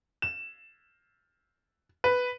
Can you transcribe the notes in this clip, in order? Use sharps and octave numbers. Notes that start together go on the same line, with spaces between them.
E7
B4